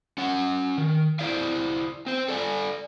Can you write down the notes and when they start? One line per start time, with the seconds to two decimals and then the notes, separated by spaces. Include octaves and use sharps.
0.18 C#4 F#5
0.78 D#3
1.19 E4 C5 D5 E5 F5
2.06 C4 C5
2.28 A4 D5 G#5